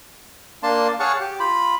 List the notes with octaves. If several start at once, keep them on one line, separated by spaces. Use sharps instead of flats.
A#3 D4 A5 C6
G#4 C#5 F5 F#5 A5 C#6
G4
F4 B5